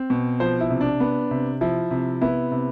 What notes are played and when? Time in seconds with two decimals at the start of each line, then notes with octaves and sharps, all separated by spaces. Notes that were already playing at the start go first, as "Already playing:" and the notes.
Already playing: C4
0.10 B2
0.40 F3 C5
0.61 E4
0.70 C3
0.81 D4
1.00 B3
1.31 C3
1.61 F3 E4
1.91 C3
2.21 B3 E4
2.51 C3